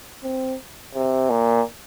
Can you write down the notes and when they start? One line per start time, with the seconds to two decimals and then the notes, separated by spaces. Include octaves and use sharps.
0.23 C4
0.95 C3
1.30 A#2